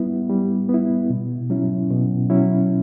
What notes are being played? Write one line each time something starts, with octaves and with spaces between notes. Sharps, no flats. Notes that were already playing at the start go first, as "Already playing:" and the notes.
Already playing: G3 B3 E4
G3
B3 E4
B2
F#3 C#4 E4
B2
F#3 C#4 E4